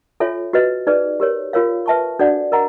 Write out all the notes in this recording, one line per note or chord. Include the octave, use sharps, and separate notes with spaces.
F4 A4 C#5 E5 G#5
F#4 B4 D#5
D#4 G#4 B4 D5
G4 A#4 C#5
F4 A#4 C#5 F5
B4 E5 A5 C#6
D4 F#4 A4 D5 F#5
A#4 D#5 F#5 A#5